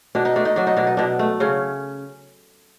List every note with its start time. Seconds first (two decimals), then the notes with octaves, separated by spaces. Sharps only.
0.15 B2 D4
0.25 D#4
0.36 A3 D4
0.45 D#4
0.56 F#3 D4
0.67 D#4
0.77 B2 D4
0.87 D#4
0.97 B2 D4
1.19 A3
1.40 C#3 C#4